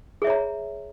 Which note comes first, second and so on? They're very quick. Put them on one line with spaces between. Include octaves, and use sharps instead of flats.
G#4 E5 C#5 A#5